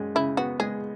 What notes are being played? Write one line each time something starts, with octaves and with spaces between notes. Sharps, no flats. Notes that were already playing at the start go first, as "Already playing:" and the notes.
Already playing: F#2 G#3
C#3 E4
B3 F#4
G#3 G#4